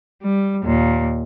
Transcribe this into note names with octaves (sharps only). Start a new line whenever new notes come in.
G3
D#2 A#2